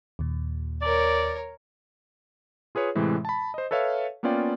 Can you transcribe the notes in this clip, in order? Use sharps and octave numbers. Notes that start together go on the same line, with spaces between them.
D#2 A#2
A#4 C#5 D5
F4 G#4 B4 C#5
A2 C3 E3 G#3
A5 B5
C5 D#5
A4 B4 C#5 E5 F5
A#3 B3 C#4 F4 D5 G5